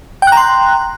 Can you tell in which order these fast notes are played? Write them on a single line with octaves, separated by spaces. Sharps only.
G5 F#6 A#5 C6